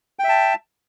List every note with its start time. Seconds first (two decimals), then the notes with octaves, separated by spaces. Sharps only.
0.19 G5
0.24 E5
0.29 A5